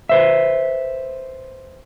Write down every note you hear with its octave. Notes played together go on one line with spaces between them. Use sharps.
B4 C5 E5